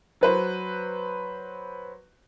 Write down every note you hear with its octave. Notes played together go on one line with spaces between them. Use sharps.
F#3 B4 C5